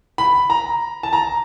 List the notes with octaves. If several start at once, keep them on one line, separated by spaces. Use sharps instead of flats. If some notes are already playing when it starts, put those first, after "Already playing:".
B5
A#5
A5
A#5